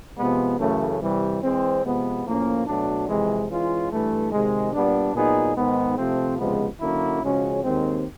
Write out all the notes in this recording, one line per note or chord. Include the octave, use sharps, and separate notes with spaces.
C3 F3 G#3 B3
F#2 C#3 E3 A3
C3 E3 G3
E3 G#3 C4
C3 F3 G#3 B3
A2 F3 A#3 C#4
B2 F#3 A3 D4
F2 C3 E3 G#3
E3 G#3 C#4 F4
G2 E3 A3
C3 D#3 G#3
A#2 G3 B3 D4
A#2 F#3 B3 D#4 G#4
G#2 D#3 G#3 B3
C3 F3 A3 C4
C#2 C3 F3 G#3 B3
D3 F#3 A#3 C#4 E4
C#3 F3 G#3 C#4 F#4
D#2 D#3 G#3 C4